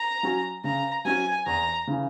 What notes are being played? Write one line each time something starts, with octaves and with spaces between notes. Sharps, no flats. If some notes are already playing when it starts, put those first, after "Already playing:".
Already playing: A#5
F#3 C#4 F#4
C#3 A#5
F#3 C#4 F#4 G#5
E2 A#5
C#3 E3